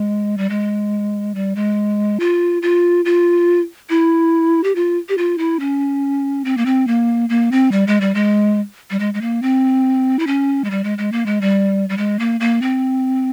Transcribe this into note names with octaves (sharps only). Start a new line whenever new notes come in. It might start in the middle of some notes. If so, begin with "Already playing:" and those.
Already playing: G#3
G3
G#3
G3
G#3
F4
F4
F4
E4
G4
F4
G4
F4
E4
C#4
C4
A#3
C4
A#3
A#3
C4
G3
G#3
G3
G#3
G3
G#3
G#3
A#3
C4
E4
C#4
G#3
G3
G#3
G#3
A#3
G#3
G3
G3
G#3
A#3
A#3
C4